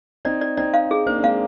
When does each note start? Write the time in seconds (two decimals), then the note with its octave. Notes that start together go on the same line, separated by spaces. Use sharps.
0.25 C4 D#4 D5
0.41 D5
0.57 C4 D#4 D5
0.74 F5
0.91 G#4
1.06 A#3 D4 C5
1.19 D4
1.23 G#3 C4 F5